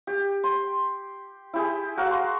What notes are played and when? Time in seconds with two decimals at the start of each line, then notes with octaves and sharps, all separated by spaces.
0.07 G4
0.44 C6
1.54 E4 G4 G#4
1.97 F#4 A#4 F5 F#5
2.11 C6